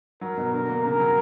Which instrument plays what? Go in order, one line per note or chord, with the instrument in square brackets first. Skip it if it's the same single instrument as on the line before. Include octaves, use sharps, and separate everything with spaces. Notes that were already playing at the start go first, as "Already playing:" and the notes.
[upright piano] F#3 [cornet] A#4
[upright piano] B2
[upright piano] D3 [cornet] A#4
[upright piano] A#3
[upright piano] C#3 [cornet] A#4
[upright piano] F#3